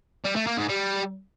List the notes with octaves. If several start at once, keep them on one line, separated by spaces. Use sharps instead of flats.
G3
A3
A#3
G#2
G3